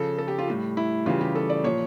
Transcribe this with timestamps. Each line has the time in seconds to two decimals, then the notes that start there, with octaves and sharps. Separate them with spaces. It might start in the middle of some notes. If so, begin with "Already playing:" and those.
Already playing: C#3 F3 A4
0.18 A4
0.28 G4
0.38 F4
0.48 A2 G3
0.77 E4
1.06 C#3 E3 G3 F4
1.21 G4
1.35 A4
1.50 D5
1.64 A#2 F3 C#5